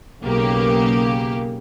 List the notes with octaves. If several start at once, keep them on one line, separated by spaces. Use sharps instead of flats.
B1 C#3 A#3 G4